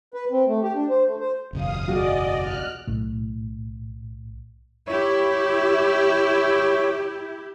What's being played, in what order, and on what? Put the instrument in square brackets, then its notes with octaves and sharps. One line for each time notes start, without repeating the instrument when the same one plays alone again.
[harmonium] B4
C4
A3
G4
D4
C5
A3
C5
[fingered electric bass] F#1 B1 E2 [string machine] F5 D#6
[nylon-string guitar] F#4 G#4 [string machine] D5 D#5
[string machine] F6 F#6
[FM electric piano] B1 A2
[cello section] E4 G4 [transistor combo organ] C#5